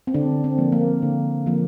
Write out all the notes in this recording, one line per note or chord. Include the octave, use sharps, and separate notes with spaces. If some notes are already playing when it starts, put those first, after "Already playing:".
C4
D3 D4
C4
F3 A#3
A#3
D3
F3 A#3